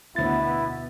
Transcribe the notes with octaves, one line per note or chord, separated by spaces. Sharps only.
D2 B2 B3 E4 A6